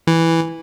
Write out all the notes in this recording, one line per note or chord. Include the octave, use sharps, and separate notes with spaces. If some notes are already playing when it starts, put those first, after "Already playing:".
E3